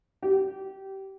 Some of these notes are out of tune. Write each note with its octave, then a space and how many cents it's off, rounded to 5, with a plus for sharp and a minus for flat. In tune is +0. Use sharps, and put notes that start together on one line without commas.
G4 -25